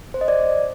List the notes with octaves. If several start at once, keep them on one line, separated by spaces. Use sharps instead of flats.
C5
D#5
D5